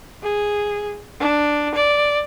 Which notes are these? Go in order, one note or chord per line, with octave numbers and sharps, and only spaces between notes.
G#4
D4
D5